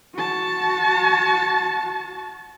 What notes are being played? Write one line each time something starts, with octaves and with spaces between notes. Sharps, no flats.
F#4 A5